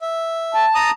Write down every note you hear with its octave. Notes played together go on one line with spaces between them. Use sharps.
E5
A5
A#5 D#6